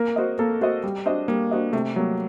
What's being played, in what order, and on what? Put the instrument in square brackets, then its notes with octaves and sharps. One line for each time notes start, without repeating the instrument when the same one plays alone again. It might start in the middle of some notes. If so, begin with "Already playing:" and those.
Already playing: [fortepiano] A#3 [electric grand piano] A#4
[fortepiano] F#4 C5 D#5
[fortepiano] A#3 [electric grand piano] A4
[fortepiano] F#4 C5 D#5
G3
D4 F#4 C5 D#5
[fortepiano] G3 [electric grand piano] A#3
[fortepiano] D4 F#4 C5 D#5
[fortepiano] C3 [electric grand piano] A3
[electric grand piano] F#3 [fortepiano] G3 A#3